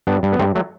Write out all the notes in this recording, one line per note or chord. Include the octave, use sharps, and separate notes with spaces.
G2 B3 D4
G2
B3
G2 A3 C4
F#3 A3